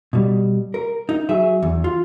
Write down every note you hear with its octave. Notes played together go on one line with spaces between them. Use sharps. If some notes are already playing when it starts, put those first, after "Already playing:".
B2 G3
A#4
D#4
F#3 G#4 E5
E2
F4